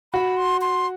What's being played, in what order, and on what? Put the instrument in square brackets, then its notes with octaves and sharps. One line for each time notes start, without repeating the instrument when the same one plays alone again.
[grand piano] F#4 [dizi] B5
[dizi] C6
C6